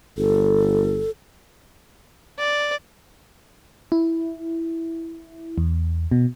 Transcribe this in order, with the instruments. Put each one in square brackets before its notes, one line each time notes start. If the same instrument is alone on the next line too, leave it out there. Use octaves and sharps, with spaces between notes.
[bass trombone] G1 [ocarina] A4
[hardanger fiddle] D5
[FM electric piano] E4
E2
B2